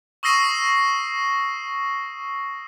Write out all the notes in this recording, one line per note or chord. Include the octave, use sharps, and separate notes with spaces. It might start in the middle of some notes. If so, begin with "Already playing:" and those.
C#6 D#6 E6 A#6 C7 D#7